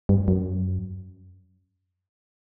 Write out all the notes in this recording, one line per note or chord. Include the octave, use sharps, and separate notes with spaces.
G2
F#2